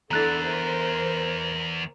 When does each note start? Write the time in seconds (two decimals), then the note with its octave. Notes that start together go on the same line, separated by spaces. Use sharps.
0.11 E2 D3 E4 A4 A#5 F#6 A6
0.44 A#4 C5